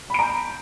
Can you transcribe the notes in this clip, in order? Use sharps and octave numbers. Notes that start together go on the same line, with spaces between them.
A#5 B5 G6 D7